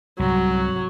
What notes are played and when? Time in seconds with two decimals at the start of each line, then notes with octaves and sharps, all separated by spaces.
0.19 C2 G#2 F#3